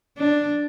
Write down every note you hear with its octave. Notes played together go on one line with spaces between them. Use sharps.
D4